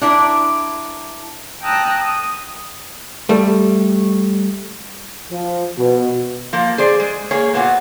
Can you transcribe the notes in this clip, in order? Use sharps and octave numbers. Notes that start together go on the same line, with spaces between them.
D4 E4 A#4
G5 A5 A#5 D#6 E6 F#6
D#6
G3 A3
F3
B2
F3 A#3
G#4 C5 D5
G#3
A#3 G#4 C#5
A#2 B3 F#4 C#5